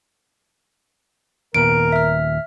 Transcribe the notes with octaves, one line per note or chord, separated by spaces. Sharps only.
D#2 A#2 B3 A#4 D7
E5 F6